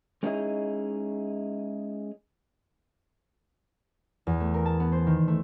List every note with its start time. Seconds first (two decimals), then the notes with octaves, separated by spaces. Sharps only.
0.23 G#3 C#4 D#4 E4 G#4 D#5
4.27 E2
4.40 A3
4.54 A#4
4.65 A5
4.80 B3
4.92 C5
5.07 D#3
5.28 A3